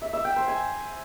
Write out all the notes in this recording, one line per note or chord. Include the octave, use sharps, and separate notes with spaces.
E5
E5
G5
C5
G#5